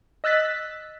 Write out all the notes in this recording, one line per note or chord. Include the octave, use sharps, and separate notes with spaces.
D#5 E6 F#6 A6 B6